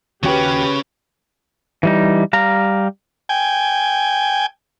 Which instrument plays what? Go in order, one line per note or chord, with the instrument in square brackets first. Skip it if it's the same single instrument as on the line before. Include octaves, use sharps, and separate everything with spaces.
[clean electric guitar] D#2 F#4 G5 [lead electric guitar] C#3 C#4 [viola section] G4 B4
[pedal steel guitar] E3 G3 D#4
G3 F5 A#5
[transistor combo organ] G5 G#5